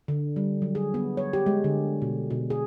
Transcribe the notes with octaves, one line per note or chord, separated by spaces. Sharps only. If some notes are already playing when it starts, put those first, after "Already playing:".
D3
G3
F#3
G#4
B3
C#5
G4
G#3
D3
B2
B2
G#4